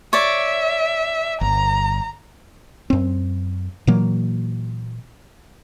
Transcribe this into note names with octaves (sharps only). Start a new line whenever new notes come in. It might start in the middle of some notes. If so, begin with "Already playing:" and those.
C#5 D5 E5
G1 A#5
F#2 C4
A#2 E3 F#3 A#3